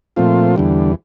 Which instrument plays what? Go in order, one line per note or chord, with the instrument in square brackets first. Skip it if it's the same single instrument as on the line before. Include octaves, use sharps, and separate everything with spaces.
[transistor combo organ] A#2 F3 A3 C4 F4
E2 D3 G3